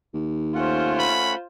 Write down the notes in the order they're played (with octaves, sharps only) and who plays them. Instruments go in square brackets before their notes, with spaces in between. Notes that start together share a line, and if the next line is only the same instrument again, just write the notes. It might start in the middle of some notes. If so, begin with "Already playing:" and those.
[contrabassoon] D#2
[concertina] A3 C#4 F#5 [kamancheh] F4 C5
[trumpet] B5